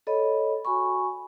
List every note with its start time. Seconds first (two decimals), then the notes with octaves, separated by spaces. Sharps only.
0.07 A4 C#5 D#5 B5
0.65 F#4 G#5 B5 C#6